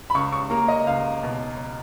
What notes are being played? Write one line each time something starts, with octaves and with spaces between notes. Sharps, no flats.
B5
C#2 C#6
C#6
A#3 A#5
D#5
C#2 F5
B2